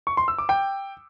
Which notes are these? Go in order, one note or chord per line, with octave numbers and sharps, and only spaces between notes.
C#6
C6
E6
D6
G5